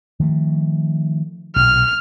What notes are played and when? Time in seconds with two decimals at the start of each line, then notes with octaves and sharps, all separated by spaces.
0.20 D#3 F3 A3
1.56 B1 A#2 F6